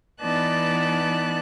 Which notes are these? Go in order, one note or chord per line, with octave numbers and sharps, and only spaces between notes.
E3 B3 D#4 D5 A5 F#6